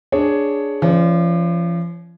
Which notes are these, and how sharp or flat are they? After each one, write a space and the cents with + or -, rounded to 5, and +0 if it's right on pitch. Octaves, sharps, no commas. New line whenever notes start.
D4 +0 G#4 +5 C#5 +0
F3 -35 C#4 +0 D5 +0